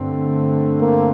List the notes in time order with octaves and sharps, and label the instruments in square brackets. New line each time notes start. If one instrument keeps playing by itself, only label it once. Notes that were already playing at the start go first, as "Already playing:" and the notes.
Already playing: [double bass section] G2 D3 A3 C4
[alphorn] A#3